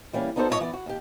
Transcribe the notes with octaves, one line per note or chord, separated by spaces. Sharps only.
E3 G3 A#3 C#4
B3 D4 D#4 F#4 A4 C5
F2 G#2 D4 D#4 C#5 D#5
E3 B3 D5
F#4
D#2 G4